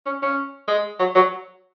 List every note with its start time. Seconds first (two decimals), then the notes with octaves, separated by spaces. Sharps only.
0.06 C#4
0.22 C#4
0.68 G#3
0.99 F#3
1.15 F#3